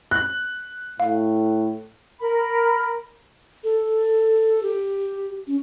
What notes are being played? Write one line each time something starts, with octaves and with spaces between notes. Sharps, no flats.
F#6
A2 F5
A#4 B5
A4
G4
C#4